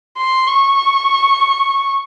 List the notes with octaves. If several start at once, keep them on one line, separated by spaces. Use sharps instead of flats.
C6
C#6